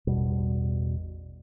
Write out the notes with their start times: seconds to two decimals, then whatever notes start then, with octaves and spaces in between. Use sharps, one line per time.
0.07 A1 E2 B2 G3